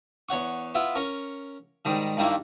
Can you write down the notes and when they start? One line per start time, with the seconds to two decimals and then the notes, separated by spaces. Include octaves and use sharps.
0.29 E2 C#5 F#5 C#6
0.75 B3 E4 F4
0.95 C#4 A#4 C#6
1.85 G#2 D#3 G3
2.17 G2 D#3 G3 A#3 E4